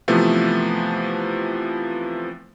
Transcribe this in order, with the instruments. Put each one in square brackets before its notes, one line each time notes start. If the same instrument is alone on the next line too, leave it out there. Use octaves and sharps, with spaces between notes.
[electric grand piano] C3 E3 F3 A3 B3